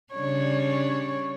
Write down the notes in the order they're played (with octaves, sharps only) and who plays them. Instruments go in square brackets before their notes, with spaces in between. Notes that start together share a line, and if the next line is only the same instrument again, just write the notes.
[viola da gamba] C#3 G3 D4 [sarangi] C#5